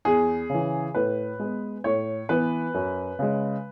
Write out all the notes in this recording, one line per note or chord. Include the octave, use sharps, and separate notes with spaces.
E2 G#4
C#3 E3
A2 B4
G#3 B3
A2 C#5
E3 B3 B4
F#2
C#3 G#3